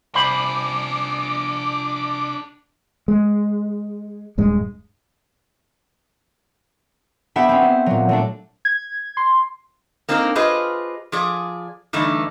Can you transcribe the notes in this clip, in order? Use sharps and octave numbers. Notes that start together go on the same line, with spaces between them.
C2 D4 G#4 C5 D5 B5 D6
G#3
D#1 G2 G#3
B3 D4 G4 E5 F#5 B5
C4 C#4
C5
A#2 F#3
F#3 A3 D4
G#6
C6
A#3 C4 D4 D#4 F#4 A#4
F4 G4 G#4 B4 C5 D#5
F3 G#4 D5
G2 D3 E3 A3 D#4